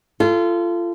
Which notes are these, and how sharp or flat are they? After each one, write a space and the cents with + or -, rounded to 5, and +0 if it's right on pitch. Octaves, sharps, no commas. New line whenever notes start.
F4 -25 A4 +0